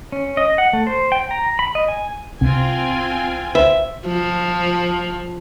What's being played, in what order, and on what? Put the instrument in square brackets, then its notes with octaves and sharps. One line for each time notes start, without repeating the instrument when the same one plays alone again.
[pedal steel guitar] C#4
D#5
F#5
A3
C5
G5
A#5
B5
D#5
G#5
[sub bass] C2 [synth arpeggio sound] C3 [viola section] C4 F4 G#5
[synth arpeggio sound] B4 C5 [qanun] E5
[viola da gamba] F3